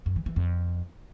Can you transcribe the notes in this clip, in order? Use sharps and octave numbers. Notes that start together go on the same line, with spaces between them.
F#2
E3
E3
F2